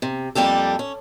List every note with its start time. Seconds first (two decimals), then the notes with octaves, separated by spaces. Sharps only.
0.02 C3
0.35 F2 G3 A#3 G4 A4
0.79 C#4